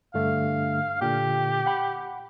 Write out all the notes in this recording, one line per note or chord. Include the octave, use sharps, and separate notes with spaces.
G2 D3 A3 F5
A#2 D3 G4
F#5 G5 B5